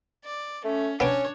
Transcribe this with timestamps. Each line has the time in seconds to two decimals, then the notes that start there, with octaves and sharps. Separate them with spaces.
0.24 D5
0.64 A3 C#4
1.00 B3 C#4 D4 C#5 G5